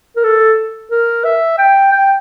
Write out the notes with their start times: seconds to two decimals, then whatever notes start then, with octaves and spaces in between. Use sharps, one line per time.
0.16 A#4
0.24 A4
0.91 A#4
1.24 E5
1.58 G5
1.92 G5